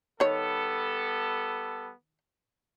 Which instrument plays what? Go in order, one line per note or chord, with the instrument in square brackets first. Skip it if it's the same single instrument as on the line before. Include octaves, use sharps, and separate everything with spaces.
[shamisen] D#3 C#5 [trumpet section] G3 B3 A4